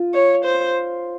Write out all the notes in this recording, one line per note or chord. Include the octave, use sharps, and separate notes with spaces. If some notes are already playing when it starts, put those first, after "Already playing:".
Already playing: F4
C#5
C5